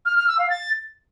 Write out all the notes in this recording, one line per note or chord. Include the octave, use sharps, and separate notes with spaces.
F6
F6
E6
F5
A6